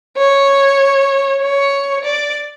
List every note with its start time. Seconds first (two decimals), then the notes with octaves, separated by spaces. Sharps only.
0.17 C#5
1.42 C#5
2.04 D5